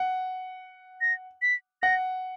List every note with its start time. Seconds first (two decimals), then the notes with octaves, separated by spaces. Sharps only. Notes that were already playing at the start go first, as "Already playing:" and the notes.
Already playing: F#5
1.01 A#6
1.42 B6
1.82 F#5 A#6